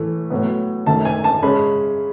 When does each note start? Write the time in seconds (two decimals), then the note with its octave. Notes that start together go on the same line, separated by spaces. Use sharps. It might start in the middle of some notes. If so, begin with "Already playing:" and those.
Already playing: A2 E3 A3
0.30 A2 F#3 B3
0.87 F#2 D#3 A3 A5
1.05 G#5
1.24 A5
1.42 C#3 G#3 C#4 B5